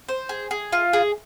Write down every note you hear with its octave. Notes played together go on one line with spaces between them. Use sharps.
C5
G#4
G#4
F4
G#4